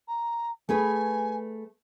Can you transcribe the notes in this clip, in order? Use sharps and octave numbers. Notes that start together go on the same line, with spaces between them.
A#5
A3 G#4 B4 G#5